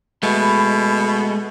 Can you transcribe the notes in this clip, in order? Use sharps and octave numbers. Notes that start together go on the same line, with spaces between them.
B2 G#3 A3 B5